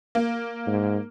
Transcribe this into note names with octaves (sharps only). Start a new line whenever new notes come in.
A#3
G#2